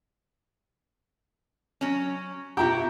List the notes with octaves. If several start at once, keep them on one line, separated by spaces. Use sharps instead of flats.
F#3 C#4
B2 E4 F4 G4 A#5 G6